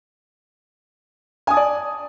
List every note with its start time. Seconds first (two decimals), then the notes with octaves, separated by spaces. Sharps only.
1.47 G#5
1.50 D#6
1.54 A5
1.57 D5